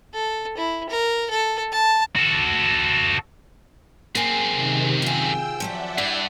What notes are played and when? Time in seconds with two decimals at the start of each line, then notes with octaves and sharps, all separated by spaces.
0.14 A4
0.57 E4
0.90 A#4
1.30 A4
1.72 A5
2.16 F#4 A4
4.15 F#2 A#3 C4 G#4
4.52 C3 D#3
5.02 F4 G#4 G5 E6
5.60 F3 F#3 G4 D5 E5 F#5
5.98 G2 E4